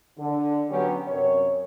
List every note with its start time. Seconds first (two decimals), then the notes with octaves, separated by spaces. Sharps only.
0.18 D3
0.71 F#3 B3 C#4 G4
1.08 F#2 C3 C#5